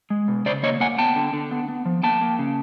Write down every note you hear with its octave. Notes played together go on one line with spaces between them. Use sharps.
G#3
B2
C#3 C5 D5
A#3 C#5 D#5
A#3 F#5 G#5
B3 G5 A5
D3
D3
B3
B3
F3
A#3 G5 A5
A#3
C#3